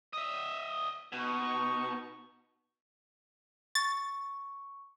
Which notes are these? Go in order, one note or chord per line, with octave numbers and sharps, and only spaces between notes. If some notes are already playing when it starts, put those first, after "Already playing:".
D#5 E5
B2 D#4 C#6
C#6 A6